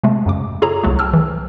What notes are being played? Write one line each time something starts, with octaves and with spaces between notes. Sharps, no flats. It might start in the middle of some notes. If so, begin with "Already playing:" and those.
C3 G#3 A3
F#2 C#3 D6
F4 G#4 A4 C#5 A#5
C2 C3 F#3 A3
G5 A5 E6 F6
E3